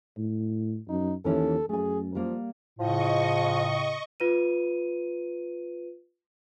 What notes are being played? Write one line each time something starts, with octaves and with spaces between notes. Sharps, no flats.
A2
F#2 D#4
D#2 E3 C#4 E4 A4
F#2 A3 G#4 G#5
F3 G3 A#3
A2 C#3 F3 D#5 C#6
F4 B4 D#7